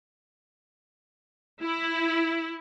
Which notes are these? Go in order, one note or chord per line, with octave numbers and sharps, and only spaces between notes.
E4